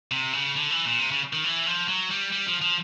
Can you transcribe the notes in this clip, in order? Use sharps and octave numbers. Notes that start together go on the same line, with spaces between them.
C3
C#3
D3
E3
A#2
C3
C#3
D#3
E3
F3
F#3
G3
G3
F3
F3